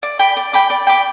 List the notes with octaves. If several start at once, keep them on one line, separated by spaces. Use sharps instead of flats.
D5
G5 B5 D6
D5
G5 B5 D6
D5
G5 B5 D6